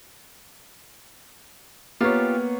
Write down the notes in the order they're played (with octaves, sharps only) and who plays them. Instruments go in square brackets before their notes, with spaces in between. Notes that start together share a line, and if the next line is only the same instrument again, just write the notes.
[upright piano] A#3 B3 C#5 [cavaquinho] F4 G4